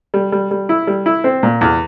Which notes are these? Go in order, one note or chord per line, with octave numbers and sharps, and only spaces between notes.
G3
G3
G3
E4
G3
E4
C4
A#2
E2